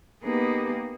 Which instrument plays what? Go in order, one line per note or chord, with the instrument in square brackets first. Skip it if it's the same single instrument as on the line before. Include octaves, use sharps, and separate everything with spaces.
[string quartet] A#3 B3 D#4 G4 G#4 B4